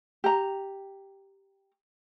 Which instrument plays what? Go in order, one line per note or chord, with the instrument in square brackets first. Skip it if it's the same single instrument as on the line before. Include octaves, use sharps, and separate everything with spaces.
[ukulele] G4 A#5